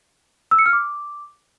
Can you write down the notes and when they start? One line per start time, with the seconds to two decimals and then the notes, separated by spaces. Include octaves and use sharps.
0.51 E6
0.59 C#7
0.66 F6
0.73 D6